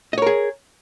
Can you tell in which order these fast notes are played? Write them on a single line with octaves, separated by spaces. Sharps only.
D#5 C#5 A#4 G#4